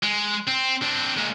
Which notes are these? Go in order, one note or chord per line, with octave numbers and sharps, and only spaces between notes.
G#3
C4
C4 D4
A#2 G#3